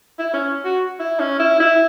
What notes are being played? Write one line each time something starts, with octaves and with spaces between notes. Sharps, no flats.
E4
C#4
F#4
E4
C#4
E4
E4